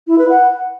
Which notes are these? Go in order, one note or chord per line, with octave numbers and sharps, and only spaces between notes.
E4
B4
F#5